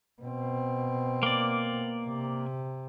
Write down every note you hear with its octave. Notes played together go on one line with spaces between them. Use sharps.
B2 C4
A#3 D5
C3